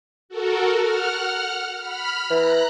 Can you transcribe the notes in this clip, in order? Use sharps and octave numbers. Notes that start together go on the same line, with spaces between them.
F#4 A4 A#4
F#5 F6
B5 F6
E3 A#5 F#6